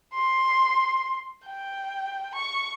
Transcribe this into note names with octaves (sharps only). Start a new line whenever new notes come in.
C6
G5
C#6